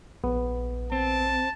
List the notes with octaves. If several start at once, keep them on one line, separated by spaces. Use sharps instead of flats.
A#1 B3
C4 A5